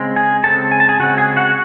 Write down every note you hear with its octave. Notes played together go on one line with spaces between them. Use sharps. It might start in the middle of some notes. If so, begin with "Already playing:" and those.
Already playing: C#3 G#3 C4
G#4 G#5
C#3 G#3 C4 A4 A5
G#5
A5
G#4 G#5
C#3 G#3 C4 F#4 F#5
G#4 G#5
F#4 F#5